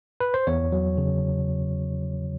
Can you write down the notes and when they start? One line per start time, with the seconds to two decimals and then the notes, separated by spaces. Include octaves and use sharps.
0.20 B4
0.34 C5
0.47 E2 C#5
0.72 F#3
0.98 C#3